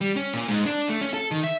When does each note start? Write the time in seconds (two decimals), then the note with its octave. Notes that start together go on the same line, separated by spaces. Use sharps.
0.01 G3
0.16 C#4
0.34 A#2
0.48 G#2
0.66 D4
0.89 A3
1.01 C#4
1.14 A4
1.31 D#3
1.44 E5